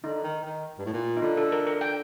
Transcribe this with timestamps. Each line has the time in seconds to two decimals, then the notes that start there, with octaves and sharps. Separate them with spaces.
0.04 D3 D#4
0.23 D#3
0.44 D#3
0.78 G2
0.86 A2
0.93 A#2
1.17 D#4
1.22 D3 F4
1.37 A4
1.52 A#4
1.67 A#4
1.81 G5